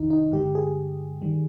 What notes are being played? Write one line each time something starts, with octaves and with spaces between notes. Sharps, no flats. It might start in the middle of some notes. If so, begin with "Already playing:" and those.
Already playing: G1 F2 C3 D#3 D#4
D#4
G2 D3 G#3 G4
G#4
D#3 G3